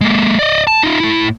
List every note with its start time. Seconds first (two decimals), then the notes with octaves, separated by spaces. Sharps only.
0.01 G#3 A#3
0.39 D5 D#5
0.67 A5
0.83 D#4 F4
1.00 A2 E4